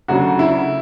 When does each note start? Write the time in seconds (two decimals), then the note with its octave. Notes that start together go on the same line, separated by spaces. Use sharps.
0.08 D2 C#3 F#3 F#4
0.39 E4